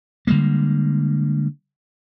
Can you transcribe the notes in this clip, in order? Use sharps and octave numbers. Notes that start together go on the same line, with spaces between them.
D3 G3 G#3 A#3